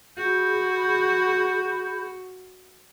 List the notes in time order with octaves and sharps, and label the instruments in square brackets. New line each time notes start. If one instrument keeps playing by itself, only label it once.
[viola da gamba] F#4 [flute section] G#4 B5 G6